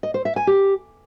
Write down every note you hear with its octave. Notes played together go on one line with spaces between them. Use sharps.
D#5
C5
E5
G#5
G4